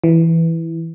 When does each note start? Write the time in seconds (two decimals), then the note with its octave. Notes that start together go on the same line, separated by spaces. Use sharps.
0.04 E3